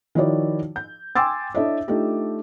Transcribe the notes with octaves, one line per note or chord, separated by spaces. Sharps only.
D#3 F3 E4 F#4 C#5 D5
G6
G5 G#5 C6 D6 E6 A6
D4 E4 A4 C#5 D#5 E5
A3 D4 D#4 F4 G4